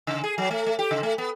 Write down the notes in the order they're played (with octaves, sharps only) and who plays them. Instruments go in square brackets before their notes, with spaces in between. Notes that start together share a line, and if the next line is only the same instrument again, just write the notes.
[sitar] C#3
G#4
F#3
A3
A3
G4
C#3
A3
B3